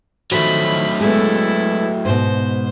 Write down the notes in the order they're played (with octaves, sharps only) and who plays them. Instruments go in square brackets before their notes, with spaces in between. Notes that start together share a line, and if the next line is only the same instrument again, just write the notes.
[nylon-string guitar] D#3 F3 [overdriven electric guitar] F#3 A3 [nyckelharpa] B5
[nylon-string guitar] G#3 B3 [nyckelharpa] E4 A4
[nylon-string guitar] G#2 B2 [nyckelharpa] C5